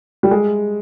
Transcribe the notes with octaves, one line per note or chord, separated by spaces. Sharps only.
G3
G#3